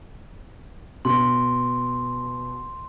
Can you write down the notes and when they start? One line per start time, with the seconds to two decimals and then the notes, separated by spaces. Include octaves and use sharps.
1.05 B2 C6